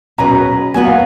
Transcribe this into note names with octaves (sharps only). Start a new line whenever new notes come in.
B2 F#3 C#4 G#4 B4 A#5
F#3 B3 F#4 B4 G#5
F5